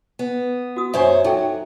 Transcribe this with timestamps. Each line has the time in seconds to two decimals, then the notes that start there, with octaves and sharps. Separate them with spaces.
0.19 B3
0.76 F#4 D#6
0.94 F#2 C5 C#5 E5 G#5
1.24 F#3 D#4 A4 G5